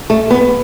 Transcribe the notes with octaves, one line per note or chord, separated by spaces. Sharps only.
A3
B3